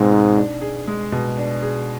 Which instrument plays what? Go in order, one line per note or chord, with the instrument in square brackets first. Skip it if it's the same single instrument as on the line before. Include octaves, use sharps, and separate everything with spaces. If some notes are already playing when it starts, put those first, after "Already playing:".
Already playing: [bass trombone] G#2 [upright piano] B2 G#3 C4
[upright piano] D#4
D4
G#4
G#3
B2
D4
G#4